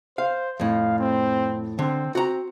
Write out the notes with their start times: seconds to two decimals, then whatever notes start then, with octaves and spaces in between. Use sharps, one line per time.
0.18 C5 F5
0.60 F2 A2 F5
0.99 C4
1.79 D3 C4
2.15 C4 F#4 A#5